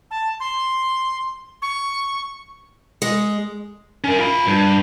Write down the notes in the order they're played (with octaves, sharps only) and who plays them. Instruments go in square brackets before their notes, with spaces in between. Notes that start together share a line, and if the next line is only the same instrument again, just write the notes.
[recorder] A5
C6
C#6
[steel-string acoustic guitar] G#3
[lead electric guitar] C#4 A#4
F4 B5
G2